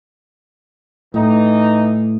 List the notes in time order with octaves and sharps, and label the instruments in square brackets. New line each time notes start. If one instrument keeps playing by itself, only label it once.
[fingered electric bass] A2 [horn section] E3 D#4